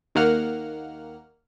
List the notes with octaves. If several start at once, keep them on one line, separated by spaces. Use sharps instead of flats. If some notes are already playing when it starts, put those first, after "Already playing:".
D#2 D#3 A#3 F#5 F6